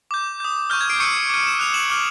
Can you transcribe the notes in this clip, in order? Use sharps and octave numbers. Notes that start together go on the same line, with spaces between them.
D6 G6
D#6 G6
C#6 F6 G6
G#6
C7 D7
C#6 E6 G6 C#7 D#7
D6 F6 D#7
E7
D#6 F#6 F7
E7 F#7
D6 F6